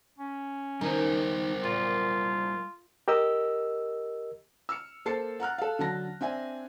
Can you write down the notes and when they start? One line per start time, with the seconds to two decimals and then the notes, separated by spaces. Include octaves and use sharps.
0.18 C#4
0.81 D#3 G3 D#4 A#4 C5
1.64 A#2 F4
3.08 G4 A#4 D#5 E6
4.69 E6 F6 C#7
5.05 A#3 A4 C5 A6 C7 C#7
5.40 F#5 A#5 F6 F#6
5.58 A4 F5
5.79 D3 F#3 A5 A#6
6.21 C4 D4 E5 G#5